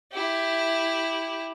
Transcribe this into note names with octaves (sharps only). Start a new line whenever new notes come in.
E4 G4